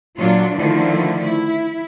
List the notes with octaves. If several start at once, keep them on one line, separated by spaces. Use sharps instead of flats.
A#2 F#3 D4 F4
D3 D#3 F3 A3 E4
E4